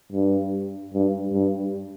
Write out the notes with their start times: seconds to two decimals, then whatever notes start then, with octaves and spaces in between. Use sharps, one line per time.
0.13 G2
0.94 G2
1.33 G2